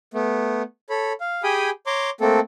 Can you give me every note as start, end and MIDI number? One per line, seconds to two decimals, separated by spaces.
0.14 0.62 57
0.14 0.62 59
0.90 1.13 69
0.90 1.13 73
0.90 1.13 83
1.20 1.43 77
1.43 1.70 67
1.43 1.70 68
1.43 1.70 79
1.43 1.70 80
1.43 1.70 83
1.43 1.70 87
1.87 2.10 73
1.87 2.10 82
1.87 2.10 84
1.87 2.10 86
2.21 2.40 57
2.21 2.40 58
2.21 2.40 60
2.21 2.40 69